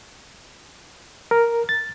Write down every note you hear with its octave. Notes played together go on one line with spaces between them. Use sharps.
A#4
A6